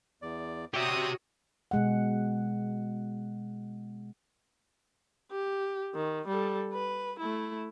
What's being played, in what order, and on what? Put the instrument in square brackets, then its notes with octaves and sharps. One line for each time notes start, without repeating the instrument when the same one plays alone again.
[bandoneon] E2 D5
[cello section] F#4 [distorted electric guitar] G4 E5 [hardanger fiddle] C#5 D#6 [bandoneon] D5
[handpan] B2 G#3 F#5
[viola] G4
D#3
G3 A4
B4
A3 E4